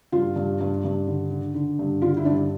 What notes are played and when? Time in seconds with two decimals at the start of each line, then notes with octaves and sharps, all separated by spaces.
0.12 G2 F4
0.36 G2
0.61 G2
0.84 G2
1.07 D3
1.31 D3
1.54 D3
1.79 G2
2.02 D3 F4
2.17 E4
2.25 G2 D4